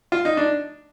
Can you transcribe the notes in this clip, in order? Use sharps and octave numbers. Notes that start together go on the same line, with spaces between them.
F4
D#4
D4